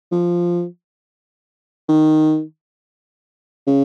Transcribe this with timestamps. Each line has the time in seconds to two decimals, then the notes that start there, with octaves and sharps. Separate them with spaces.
0.12 F3
1.88 D#3
3.67 C#3